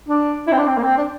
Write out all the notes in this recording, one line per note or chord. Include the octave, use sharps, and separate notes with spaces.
D4
E4
C4
D4
C4
A#3
C4
D4